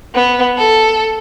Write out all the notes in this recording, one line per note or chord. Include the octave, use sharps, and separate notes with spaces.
B3
A4